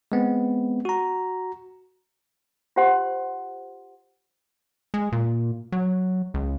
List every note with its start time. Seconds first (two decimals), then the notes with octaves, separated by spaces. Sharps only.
0.12 G#3 B3 C4
0.85 F#4 A#5
2.76 F4 G4 C5 F#5 C6
4.94 G#3
5.12 A#2
5.72 F#3
6.34 C#2